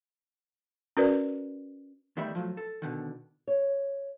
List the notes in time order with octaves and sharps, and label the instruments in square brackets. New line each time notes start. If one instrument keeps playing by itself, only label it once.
[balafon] C#4 F#4 A#4 B4 D5
[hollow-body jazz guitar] E2 D#3 G3 A3 E5 B5
F3 F#3 A3
A4
B2 D3 D#3
[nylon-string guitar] C#5